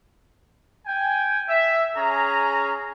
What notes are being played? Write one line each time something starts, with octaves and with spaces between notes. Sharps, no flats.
G5 G#5
E5
C#4 G#4 A#5